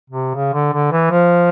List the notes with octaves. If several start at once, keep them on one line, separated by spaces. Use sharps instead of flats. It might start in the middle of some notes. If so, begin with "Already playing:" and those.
C3
C#3
D3
D3
E3
F3